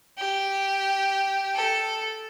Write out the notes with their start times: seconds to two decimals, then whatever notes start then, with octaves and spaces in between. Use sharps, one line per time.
0.18 G4
1.55 A4